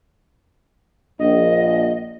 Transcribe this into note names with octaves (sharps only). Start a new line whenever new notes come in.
A#1 D#5